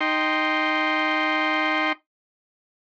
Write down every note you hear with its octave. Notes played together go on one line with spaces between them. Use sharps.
D#4 G5 C6